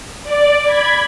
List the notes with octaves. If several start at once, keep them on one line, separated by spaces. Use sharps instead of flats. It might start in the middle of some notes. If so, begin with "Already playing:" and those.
D5
B5 G#6